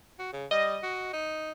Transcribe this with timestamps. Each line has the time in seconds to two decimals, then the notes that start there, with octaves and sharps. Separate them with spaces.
0.19 F#4
0.33 C#3
0.51 G3 D#5
0.83 F#4
1.13 D#4